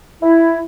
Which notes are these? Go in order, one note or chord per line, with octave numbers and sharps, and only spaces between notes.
E4